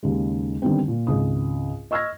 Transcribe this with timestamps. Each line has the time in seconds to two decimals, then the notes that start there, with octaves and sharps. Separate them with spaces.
0.03 D#2 C#3 G#3
0.62 D3 D#3 G3 B3 C4
0.88 A#2
1.07 G#1 C#2 D#6
1.91 D#5 C#6 E6 F6 G#6 A#6